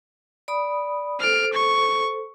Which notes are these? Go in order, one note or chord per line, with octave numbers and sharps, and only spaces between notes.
D5 B5 D#6
A4 C5 F6 D7
C#6